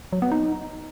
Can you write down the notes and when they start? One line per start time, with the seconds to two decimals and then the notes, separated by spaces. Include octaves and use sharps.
0.13 F#3
0.22 B3
0.32 D#4